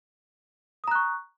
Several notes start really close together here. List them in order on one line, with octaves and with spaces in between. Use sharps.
D#6 A#5 F#6 C#6